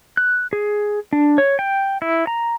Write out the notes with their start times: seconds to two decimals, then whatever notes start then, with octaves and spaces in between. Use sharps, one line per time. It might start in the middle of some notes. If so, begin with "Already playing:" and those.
0.17 F#6
0.53 G#4
1.13 D4
1.38 C#5
1.59 G5
2.02 E4
2.27 A#5